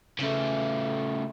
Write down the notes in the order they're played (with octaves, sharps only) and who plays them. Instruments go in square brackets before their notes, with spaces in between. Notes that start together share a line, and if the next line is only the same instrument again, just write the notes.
[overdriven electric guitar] C#3 A3